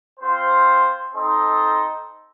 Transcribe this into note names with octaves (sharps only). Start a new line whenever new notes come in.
C4 F4 C5
C4 D#4 A4 C5 D#5